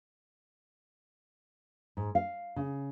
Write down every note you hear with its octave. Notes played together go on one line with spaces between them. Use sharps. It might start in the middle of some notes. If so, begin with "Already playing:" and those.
G#2
F5
C#3